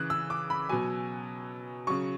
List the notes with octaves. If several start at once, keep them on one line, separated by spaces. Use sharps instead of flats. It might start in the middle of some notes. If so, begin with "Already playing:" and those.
Already playing: C#3 E3 F#6 G#6
E6
D6
B5
B2 F#3 G#5
C#3 F#3 C#6